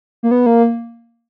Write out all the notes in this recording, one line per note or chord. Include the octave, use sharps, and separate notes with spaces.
A#3
B3
A#3